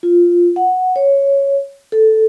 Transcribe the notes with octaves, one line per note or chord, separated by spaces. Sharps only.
F4
F#5
C#5
A4